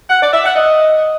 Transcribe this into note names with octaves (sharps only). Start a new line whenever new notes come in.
F#5
D5
E5
F#5
D#5